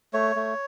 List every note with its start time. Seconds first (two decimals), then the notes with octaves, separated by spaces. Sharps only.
0.13 A3 C#5
0.36 A3